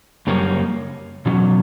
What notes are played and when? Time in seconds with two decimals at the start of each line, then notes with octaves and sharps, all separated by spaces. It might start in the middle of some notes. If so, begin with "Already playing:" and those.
0.27 F#2 C#3 G3 A#3 C#4
1.26 E2 B2 F#3 C#4